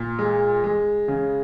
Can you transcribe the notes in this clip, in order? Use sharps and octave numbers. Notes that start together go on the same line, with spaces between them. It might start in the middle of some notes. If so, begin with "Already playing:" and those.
Already playing: A#2
G#3
G#3
C#3